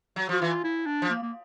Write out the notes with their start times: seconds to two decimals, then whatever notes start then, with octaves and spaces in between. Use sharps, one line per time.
0.16 F#3
0.29 F3 F#4
0.41 E3 F4
0.64 E4
0.86 D4
1.02 F3
1.10 A#3
1.22 A#3